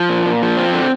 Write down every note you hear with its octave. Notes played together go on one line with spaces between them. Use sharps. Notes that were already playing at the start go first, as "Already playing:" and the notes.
Already playing: F3
A#2
A#2
F3
C4
D3